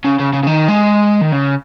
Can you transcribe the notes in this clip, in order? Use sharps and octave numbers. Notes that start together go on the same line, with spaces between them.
C#3
C#3
C#3
C#3
D#3
G#3
D#3
C#3